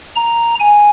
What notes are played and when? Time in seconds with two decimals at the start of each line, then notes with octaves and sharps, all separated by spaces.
0.16 A#5
0.60 G#5